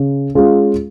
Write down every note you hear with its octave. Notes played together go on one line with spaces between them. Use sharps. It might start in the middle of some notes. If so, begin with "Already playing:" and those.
Already playing: C#3
G#3 C#4 F4 G#4